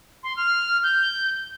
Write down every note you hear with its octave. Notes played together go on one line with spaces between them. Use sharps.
C6
F6
G6